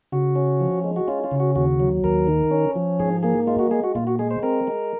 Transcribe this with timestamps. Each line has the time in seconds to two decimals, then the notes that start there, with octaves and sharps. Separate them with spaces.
0.12 C#3 F#4
0.36 C#4
0.60 F3
0.84 G#3
0.96 F#4
1.08 C#4 F4
1.24 F4
1.32 C#3
1.40 F#4
1.56 D#2 F#4
1.80 F#3
2.04 D#2 A#4
2.27 D#3
2.51 C#4
2.76 F3
3.00 G#2 G#4
3.23 A#3 G#4
3.47 G#3 F4
3.59 F#4
3.71 G#3 G#4
3.84 F#4
3.95 A#2 F4
4.07 F#4
4.19 G#3 G#4
4.31 C5
4.43 C4 A#4
4.67 G#3